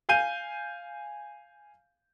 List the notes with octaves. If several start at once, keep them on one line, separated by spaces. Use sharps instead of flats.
F5 G#5 G6 D#7